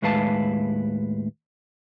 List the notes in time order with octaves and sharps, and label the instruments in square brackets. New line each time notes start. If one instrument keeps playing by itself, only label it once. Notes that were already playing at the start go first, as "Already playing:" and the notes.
[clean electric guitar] D#2 A2 G#3 B4 F5 A5